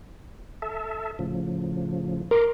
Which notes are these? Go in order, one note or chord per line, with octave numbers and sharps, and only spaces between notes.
A4 E5
A2 C#3 F3
A#4 A#5 C6 D6